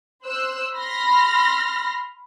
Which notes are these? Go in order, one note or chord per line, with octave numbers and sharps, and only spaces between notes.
C5 E6 F#6
B5 C6 F6 A#6